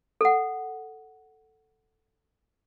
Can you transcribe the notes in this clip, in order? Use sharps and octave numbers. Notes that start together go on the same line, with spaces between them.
A4 F#5